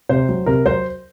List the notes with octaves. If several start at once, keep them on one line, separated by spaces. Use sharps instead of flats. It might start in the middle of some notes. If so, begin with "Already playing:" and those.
C3 C5
F#3
C3 A#4
F#3 C5